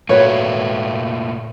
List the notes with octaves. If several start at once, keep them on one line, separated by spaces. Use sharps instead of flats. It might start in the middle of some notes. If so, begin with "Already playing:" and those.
A#2 A3 A#3 F#4 B4 C#5